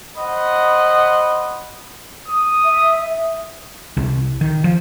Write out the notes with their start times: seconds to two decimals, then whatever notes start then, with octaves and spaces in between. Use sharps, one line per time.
0.17 C5 D#5 F#5 B5
2.28 D#6
2.65 E5
3.97 C2
4.41 D#3
4.64 F3